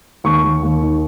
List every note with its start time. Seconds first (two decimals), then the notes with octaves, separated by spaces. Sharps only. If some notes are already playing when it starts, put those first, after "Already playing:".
0.24 D#2 C#6
0.44 D#2
0.63 D#2
0.83 D#3